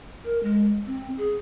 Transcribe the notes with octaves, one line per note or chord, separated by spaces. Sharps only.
A#4
G#3
C4
G#4